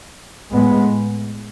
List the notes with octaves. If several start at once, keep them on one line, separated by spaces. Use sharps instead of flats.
A2 G#3 B3